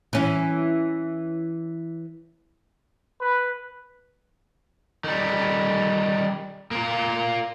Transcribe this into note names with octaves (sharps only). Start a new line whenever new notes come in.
E3 C#4
B4
D#3 G3
A#3 F4